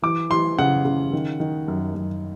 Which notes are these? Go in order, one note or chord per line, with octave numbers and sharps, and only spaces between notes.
E3 D6
E3 C6
C#3 F#5
C#3
D#3
D#3
F#2
F#2